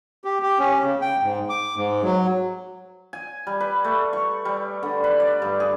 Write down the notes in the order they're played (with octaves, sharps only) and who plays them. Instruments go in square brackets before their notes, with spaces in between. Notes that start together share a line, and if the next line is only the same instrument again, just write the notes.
[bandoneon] G4
G4
C#4
C#3
G5
G#2
D6
G#2
F#3
[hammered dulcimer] G#5
G3
B4
A3
C#6
G3
D3
B4
D5
G2
G#4